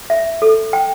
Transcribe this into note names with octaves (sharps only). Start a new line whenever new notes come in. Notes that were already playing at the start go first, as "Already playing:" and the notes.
E5
A4
G5